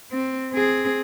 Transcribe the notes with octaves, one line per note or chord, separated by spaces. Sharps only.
C4
C4 G#4